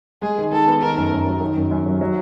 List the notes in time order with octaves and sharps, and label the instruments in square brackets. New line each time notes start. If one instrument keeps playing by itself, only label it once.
[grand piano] G#3 [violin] G#4
[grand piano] D#3
[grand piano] D#3 [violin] A4
[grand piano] B3
[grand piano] D#3 [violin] A#4
[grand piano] F#2
F#2
F#3
D#3
F#2
F#2
F#3
F#3